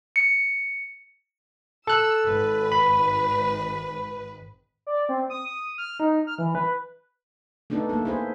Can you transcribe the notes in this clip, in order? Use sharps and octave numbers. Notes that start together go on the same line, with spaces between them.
C#7
A4 E6 F#6
G#1 B4
B5
D5
C4
D#6
D#6
F6
D#4
F6
E3
B4
A3 B3 D4 D#4 A4
A#3 A4
E4 G#4 C5